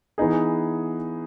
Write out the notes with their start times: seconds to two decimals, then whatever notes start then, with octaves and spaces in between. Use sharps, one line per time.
0.18 E3 B3 D#4 G#4